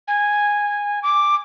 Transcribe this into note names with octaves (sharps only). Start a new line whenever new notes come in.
G#5
D6